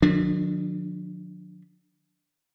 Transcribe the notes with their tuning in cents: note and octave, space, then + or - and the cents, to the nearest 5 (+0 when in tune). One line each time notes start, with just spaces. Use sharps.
D#3 -45 F#3 -45 D4 +0